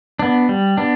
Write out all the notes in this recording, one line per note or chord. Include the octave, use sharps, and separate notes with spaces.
B3 D4
G3
B3 D4